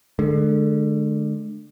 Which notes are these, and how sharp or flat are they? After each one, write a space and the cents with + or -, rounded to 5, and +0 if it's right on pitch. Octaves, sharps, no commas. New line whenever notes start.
D3 +25 G#3 +45